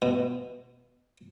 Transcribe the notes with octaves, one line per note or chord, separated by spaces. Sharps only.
B2